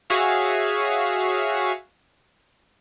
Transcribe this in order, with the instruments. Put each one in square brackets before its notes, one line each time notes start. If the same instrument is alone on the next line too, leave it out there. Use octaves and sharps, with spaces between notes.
[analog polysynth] F#4 G#4 C#5 E5 F5